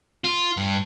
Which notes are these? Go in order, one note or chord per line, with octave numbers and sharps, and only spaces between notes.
F4
G2